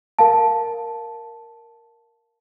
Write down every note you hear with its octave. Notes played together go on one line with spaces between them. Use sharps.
A#4 F5 A5